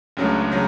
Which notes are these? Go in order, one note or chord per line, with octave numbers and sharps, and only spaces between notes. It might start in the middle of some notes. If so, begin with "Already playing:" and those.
C#2 C#3 F#3 A3 D4
C#3 F#3